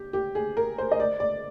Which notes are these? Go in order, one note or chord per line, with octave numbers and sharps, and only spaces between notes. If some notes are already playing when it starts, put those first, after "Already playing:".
Already playing: G4
G4
G#4
A#4
C5
D#5
D5
D5